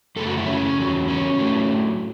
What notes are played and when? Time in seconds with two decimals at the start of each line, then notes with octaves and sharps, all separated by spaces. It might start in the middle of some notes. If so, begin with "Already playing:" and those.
0.16 F#2 C#3 A3 A4
0.27 F#4
0.37 E4
0.47 C#4
0.78 E2 C#3 F#3
1.08 C#4
1.38 A2 F#3 A3